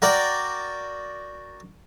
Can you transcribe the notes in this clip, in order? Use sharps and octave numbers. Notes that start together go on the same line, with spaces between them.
F#4 A#4 D5 G5